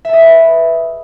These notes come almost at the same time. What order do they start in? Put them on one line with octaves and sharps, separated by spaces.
E5 A4 D#5 G#4 B4